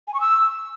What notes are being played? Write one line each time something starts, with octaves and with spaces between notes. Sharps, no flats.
G#5
C#6
E6